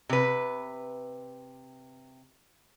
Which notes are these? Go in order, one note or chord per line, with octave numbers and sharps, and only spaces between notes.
C3 B4